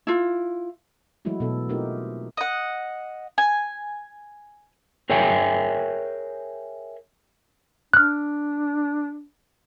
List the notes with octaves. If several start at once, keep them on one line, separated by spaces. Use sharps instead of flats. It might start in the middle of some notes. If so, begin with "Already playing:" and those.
E4 F4
E3 F#3 G#3 A3 E4 F#4
B2 B3 A4
A3 C4 D#4 F4 G4 A#4
D#5 F#5
G#5
G#4 A#4 C#5 E5 G5 G#5
D4 F6 F#6